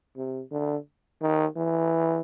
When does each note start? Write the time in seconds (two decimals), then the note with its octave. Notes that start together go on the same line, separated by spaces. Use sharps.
0.17 C3
0.51 D3
1.21 D#3
1.56 E3